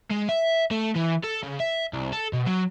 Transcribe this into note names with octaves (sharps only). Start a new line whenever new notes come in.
G#3
E5
A3
E3
A4
C#3
E5
C2
A4
B2
F#3